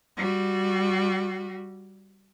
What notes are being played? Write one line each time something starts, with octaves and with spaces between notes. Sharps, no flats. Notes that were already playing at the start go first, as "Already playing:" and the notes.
G3 F#4